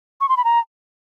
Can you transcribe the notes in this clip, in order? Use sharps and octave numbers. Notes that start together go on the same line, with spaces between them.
C#6
C6
B5
A#5